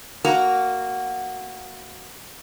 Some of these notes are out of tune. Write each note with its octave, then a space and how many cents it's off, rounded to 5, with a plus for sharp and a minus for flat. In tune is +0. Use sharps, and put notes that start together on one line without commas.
A#3 -10 F#4 +0 A#5 +0